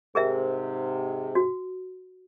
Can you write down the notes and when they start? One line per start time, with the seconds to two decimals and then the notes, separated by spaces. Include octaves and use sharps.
0.15 G#2 C3 G#4 A#4 E5
1.35 F#4